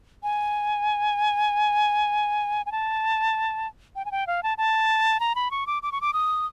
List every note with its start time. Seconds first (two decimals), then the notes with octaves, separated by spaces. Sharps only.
0.23 G#5
2.66 G#5
2.72 A5
3.96 G5
4.05 G#5
4.12 G5
4.27 F5
4.43 A5
4.58 A5
5.20 A#5
5.35 B5
5.51 C#6
5.67 D6
5.83 D6
5.92 C#6
6.01 D6
6.13 D#6